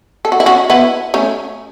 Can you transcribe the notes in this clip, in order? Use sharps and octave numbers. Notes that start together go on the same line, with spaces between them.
A4
F#4
E4
C#4 F#4
B3 E4
A3 C#4